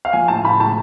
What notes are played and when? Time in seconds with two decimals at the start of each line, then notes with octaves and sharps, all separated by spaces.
0.05 F5
0.13 F3 G#5
0.28 A2 A5
0.44 A2 B5
0.60 G#3 A5